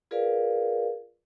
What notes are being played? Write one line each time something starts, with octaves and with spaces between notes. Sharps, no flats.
F4 G#4 A#4 B4 D5 F5